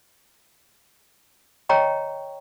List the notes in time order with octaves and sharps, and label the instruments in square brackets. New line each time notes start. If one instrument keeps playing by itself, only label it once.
[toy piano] C#5 D#5 G5 A#5 C#6